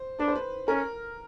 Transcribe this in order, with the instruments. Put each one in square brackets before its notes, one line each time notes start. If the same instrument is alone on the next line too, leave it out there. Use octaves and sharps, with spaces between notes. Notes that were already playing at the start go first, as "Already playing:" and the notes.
Already playing: [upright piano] C5
[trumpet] D4 [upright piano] B4
[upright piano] C5
B4
[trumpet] C#4 [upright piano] A#4